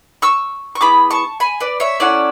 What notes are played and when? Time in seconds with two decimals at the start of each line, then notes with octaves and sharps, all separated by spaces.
0.22 C#6 E6
0.75 C#6
0.81 B3 E4 G#4 B5 D6
1.11 A5 C#6
1.40 G#5 B5
1.60 B4 D5
1.80 C#5 E5
2.00 C#4 E4 A4 D5 F#5